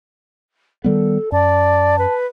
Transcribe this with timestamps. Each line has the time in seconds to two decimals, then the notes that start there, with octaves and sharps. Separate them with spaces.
0.84 D#3 G3 B3 A4
1.32 F#2 D5 A5
1.98 B4